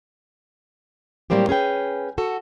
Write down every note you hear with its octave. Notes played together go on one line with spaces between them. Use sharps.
A2 F#3 G3 A#3 C4 G4
C#4 G#4 B4 G5
F#4 A4